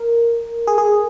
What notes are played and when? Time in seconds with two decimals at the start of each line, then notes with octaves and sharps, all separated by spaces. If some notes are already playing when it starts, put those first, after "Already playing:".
Already playing: A#4
0.67 G#4
0.78 G#4